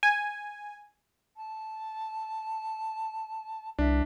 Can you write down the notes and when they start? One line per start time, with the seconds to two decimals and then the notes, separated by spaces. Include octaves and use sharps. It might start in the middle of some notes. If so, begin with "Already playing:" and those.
0.03 G#5
1.36 A5
3.79 C2 D4 E5